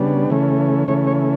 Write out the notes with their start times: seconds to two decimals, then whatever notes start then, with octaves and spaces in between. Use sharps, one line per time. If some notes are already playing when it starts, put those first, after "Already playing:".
Already playing: C#3 G3 B3 D4
0.30 C#3 E3 A3 C#4
0.88 C#3 E3 A3 C#4 C#5
1.07 C#5